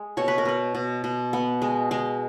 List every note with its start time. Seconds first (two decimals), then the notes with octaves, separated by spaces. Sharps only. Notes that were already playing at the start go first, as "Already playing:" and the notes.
Already playing: G#3
0.17 B2 C#5
0.28 B4
0.38 A#4
0.45 B2 B4
0.75 B2
1.04 B2
1.33 B3
1.62 G#3
1.91 G#3